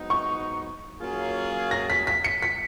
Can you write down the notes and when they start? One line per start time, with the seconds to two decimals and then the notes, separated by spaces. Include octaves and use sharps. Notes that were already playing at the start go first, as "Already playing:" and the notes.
Already playing: G#2 F#3 B3 D#4
0.10 C#6
1.00 F#3 A#3 C#4 F4 G#4
1.71 A#6
1.90 B6
2.07 B6
2.24 C#7
2.42 B6